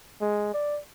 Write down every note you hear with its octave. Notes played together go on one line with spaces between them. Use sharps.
G#3
D5